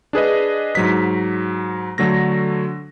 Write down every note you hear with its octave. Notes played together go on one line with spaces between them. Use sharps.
D4 G#4 B4 D#5
G#2 F#3 B6
D3 F#3 A3 A#6